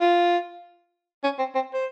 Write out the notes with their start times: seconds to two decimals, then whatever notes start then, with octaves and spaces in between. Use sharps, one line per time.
0.01 F4
1.23 C#4
1.38 C4
1.55 C4
1.74 C5